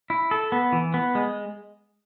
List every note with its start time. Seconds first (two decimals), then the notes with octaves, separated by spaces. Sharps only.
0.10 E4
0.31 A4
0.52 B3
0.73 E3
0.94 B3
1.15 G#3